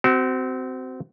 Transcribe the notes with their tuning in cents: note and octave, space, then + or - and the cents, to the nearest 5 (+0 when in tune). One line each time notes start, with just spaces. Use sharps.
C4 -15 F#4 +30